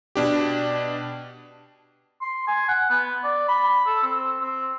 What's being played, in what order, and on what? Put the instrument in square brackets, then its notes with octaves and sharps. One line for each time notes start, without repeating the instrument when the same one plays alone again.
[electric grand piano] B2 D4 G4
[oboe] C6
G#5
F#5
B3
D5
B5
A4
C4
C4